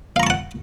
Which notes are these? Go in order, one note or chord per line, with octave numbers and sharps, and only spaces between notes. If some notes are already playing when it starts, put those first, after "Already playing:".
F5 F#5 A5 A#5 C#6